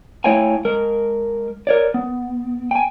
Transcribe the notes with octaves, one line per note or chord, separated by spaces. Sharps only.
A3 E4 C#5 F5 G5 G#5
G#3 A#4
A#4 C#5 D5
B3
G5 G#5